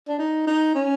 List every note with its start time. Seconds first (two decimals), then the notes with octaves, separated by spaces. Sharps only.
0.08 D4
0.19 D#4
0.47 D#4
0.75 C#4